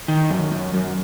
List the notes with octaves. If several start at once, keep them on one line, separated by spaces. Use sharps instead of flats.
D#3
F#2
F#2
F#2